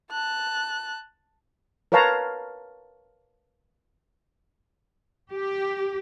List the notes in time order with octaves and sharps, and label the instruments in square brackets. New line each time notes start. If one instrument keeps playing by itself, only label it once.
[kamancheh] A5 F#6
[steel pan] A#4 B4 C#5 F5 A5 A#5
[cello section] G4